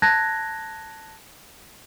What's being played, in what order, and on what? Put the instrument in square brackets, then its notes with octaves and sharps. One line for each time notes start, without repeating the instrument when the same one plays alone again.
[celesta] A5 F#6 G#6 A#6